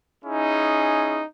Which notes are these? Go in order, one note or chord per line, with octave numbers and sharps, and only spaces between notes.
C#4 D#4 E4 G#4